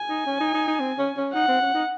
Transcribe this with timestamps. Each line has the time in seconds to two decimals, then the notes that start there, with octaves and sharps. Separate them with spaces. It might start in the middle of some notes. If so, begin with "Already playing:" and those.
Already playing: G#5
0.09 D#4
0.26 C#4
0.40 D#4
0.54 D#4
0.68 D#4
0.80 C4
0.98 C#4
1.17 C#4
1.34 D#4 F#5
1.48 C4
1.61 C#4
1.74 D#4